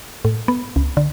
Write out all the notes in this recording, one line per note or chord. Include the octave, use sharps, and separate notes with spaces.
A2
B3
C#2
D3